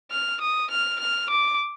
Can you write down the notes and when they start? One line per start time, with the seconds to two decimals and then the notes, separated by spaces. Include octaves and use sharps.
0.11 F6
0.41 D#6
0.71 F6
1.00 F6
1.30 D6